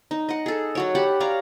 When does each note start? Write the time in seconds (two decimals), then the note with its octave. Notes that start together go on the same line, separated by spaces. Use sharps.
0.11 D#4
0.29 D#5 F#5
0.46 G#4 A4
0.75 F#3 F#4 C#5
0.95 G4 F#5 A5 B5
1.20 C#5 D5 F5 A#5